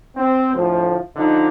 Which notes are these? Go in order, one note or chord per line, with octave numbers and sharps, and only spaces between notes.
C4
D2 A2 F3
D3 F3 D#4